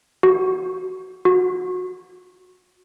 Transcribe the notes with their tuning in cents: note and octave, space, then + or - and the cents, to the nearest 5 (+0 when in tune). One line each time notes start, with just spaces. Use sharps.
F#4 +15
F#4 -20